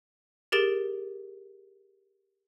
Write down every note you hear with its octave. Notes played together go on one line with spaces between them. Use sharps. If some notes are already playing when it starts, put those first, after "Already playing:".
G4 G#4 A#4 A6 D7 E7